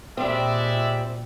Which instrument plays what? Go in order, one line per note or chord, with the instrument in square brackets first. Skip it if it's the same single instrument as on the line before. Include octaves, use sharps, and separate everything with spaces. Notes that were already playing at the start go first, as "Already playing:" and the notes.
[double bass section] A#2 [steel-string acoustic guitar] G3 C4 [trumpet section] G#3 D5 E5